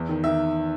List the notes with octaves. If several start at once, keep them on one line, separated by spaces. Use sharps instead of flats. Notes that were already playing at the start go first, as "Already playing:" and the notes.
Already playing: E2
D#3
D#3 E5